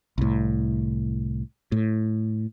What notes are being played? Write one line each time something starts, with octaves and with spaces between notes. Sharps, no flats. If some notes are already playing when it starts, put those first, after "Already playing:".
C2 A2
A2